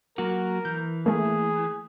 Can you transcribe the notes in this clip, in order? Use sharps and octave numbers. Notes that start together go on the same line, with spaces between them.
F#3 A#3 F#4 A#4
E3 G6
A3 A#3 G#4